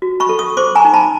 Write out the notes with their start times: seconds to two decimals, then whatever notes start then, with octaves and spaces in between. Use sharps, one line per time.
0.02 F#4
0.20 B5 C#6
0.29 A4
0.39 C#6 D#6
0.57 C5 C6 D6
0.75 G#5 A#5
0.85 D#4
0.94 A5 B5